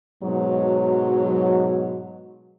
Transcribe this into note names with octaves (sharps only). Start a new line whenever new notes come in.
G#2 B2 F#3